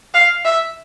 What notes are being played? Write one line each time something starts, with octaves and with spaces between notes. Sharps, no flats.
F5
E5